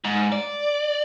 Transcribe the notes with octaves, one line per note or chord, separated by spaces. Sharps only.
G#2
D5